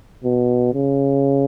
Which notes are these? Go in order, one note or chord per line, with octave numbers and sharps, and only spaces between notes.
B2
C#3